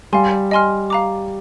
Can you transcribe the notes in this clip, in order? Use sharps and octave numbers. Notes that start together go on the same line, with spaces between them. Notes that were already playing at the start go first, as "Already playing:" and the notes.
G3 F5 G#5 C6
D#5 G#5 C6 F6
F5 A#5 D6